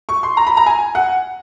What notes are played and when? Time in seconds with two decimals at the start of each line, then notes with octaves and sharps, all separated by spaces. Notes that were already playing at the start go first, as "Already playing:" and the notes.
0.09 C#6
0.23 C6
0.37 A#5
0.47 B5
0.57 A#5
0.66 G#5
0.95 F#5